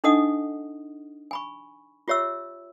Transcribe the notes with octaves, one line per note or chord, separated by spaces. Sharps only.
D4 D#4 A4 D#5 F#5 D#6
G#5 B5 C#6
F4 G4 C#5 E5 E6